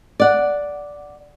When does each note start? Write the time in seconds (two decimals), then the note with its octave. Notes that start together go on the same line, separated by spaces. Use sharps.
0.20 D5 F#5